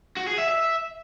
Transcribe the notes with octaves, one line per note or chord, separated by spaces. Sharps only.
F#4
G#4
E5
E5